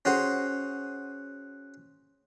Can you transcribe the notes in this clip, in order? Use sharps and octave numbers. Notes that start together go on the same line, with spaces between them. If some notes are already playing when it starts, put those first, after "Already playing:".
C#4 F#4 G#4 C5